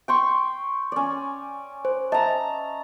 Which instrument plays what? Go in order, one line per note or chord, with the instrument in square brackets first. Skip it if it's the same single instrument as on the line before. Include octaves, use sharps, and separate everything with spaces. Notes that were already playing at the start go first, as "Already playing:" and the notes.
[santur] G5 C6 C#6
C#4 D5
[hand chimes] C5
[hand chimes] D#5 E5 [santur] A5 A#5